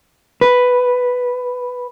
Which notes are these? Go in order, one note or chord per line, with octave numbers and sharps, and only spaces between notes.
B4